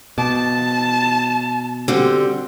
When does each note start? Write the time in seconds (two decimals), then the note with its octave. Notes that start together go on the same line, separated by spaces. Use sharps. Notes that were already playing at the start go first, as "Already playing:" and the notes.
0.18 B2 A5 D6
1.88 D3 G3 C4 F#4